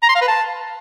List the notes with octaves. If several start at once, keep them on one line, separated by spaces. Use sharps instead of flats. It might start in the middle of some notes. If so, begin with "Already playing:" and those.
A#5
C6
F5
B4
A5